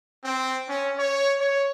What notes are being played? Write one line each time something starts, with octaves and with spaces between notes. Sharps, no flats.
C4
C#4
C#5
C#5